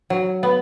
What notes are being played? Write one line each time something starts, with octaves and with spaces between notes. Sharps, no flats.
F#3
B3